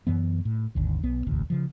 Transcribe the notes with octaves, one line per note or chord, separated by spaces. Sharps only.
F#2 E3 B3
A2
G#1 D#2 D3
B1 B3
E1 A1 D2
C#3 F3